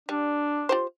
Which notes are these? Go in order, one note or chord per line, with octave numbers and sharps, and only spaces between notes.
G3 D4
F4 G4 C5